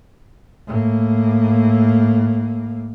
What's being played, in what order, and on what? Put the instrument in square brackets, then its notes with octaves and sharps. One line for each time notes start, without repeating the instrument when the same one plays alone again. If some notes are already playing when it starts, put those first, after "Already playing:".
[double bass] A2 A#3